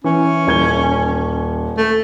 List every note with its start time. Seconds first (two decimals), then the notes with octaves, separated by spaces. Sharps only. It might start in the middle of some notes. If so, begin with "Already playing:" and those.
0.04 E3 C#4
0.47 D#1 G#6 G7
1.78 A3